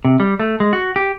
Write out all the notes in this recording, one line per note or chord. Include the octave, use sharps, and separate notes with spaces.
C3
G3
A3
G#3
F#4
G4